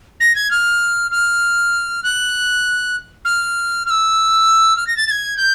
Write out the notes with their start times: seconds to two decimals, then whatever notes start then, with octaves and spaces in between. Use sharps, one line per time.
0.20 A#6
0.35 G#6
0.51 F6
1.11 F6
2.03 F#6
3.25 F6
3.86 F6
3.90 E6
4.77 F6
4.87 A#6
4.97 A6
5.07 A6
5.11 G#6
5.37 G6